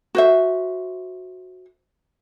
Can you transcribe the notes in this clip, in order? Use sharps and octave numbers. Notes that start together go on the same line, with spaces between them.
F#4 C5 E5